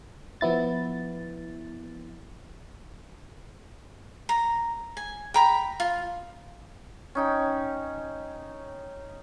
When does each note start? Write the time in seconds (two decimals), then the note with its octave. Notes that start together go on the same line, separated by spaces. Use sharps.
0.41 F3 B3 E4 A6
4.29 A#5
4.97 G#5
5.34 G5 A#5 B5
5.80 F4
7.15 C#4 D#4 G5